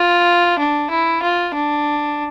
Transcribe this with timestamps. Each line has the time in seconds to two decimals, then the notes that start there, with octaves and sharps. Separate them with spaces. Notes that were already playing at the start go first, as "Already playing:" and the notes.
Already playing: F4
0.59 D4
0.90 E4
1.22 F4
1.54 D4